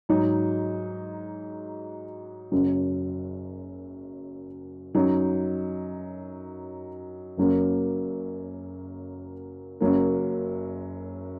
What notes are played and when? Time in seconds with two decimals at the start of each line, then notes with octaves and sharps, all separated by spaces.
0.09 G#2 F#3 D#4
2.52 F#1 F#2 F#3
4.95 F#2 F#3 D#4
7.37 F#1 F#2 F#3 A#3
9.81 F#1 F#2 F#3 A#3